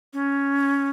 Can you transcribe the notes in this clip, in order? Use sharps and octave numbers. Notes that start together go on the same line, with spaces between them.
C#4